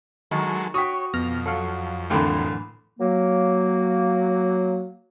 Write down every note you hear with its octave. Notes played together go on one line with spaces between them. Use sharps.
D#3 F#3 G#3 A4
F#4 C#5 G5 D#6 B6
F2 B2 F6 A#6
F#3 A4 F5
C2 F#2 A2 D3 E3 G5
F#3 A#3